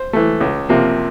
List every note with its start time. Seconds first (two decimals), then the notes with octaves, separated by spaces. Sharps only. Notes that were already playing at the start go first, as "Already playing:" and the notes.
Already playing: C5
0.13 E3 A3
0.41 C#2
0.69 C3 F3 A#3